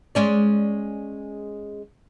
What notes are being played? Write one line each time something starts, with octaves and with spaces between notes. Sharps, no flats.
G#3 C#4 D5